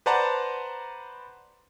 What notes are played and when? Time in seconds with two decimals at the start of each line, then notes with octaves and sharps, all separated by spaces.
0.06 B4 C5 D5 F#5 A5 A#5